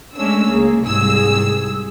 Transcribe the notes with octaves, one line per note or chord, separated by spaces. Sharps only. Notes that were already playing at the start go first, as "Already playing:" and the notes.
G#3 A3 C#4 D4 E6
C#2 A#3 G#4
C2 G#2 G#4 E6